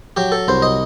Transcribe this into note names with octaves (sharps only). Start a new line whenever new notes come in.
F#3 G4
A4
C2 C5
D#5